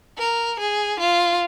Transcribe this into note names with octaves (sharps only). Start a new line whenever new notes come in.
A#4
G#4
F4